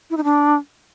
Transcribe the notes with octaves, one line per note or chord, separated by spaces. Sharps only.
E4
D#4
D4